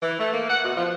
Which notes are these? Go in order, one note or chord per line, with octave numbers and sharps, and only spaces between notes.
E3
A3
A#3
F#5
B2
F3